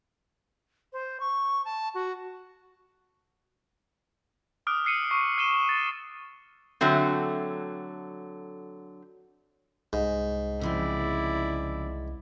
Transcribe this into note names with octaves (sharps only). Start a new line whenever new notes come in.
C5
C#6
A5
F#4
D6 D#6 F6 F#6 D7
E6 F6 C7 C#7 D#7
C#6 C7
F6 D#7 E7 G7
A6
D3 F#3 A3 C4
C2 G#2
C#3 F3 C4 E4 D5